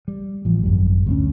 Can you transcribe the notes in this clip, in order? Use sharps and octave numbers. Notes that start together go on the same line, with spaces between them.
G3
A1 F3
G#1 F#2 G3
D2 A#3 C#4